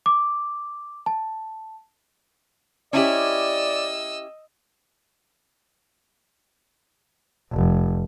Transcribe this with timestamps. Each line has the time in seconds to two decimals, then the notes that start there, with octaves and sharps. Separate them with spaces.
0.06 D6
1.06 A5
2.93 C#4 E4 G4 D5 D#5 E6
7.52 F1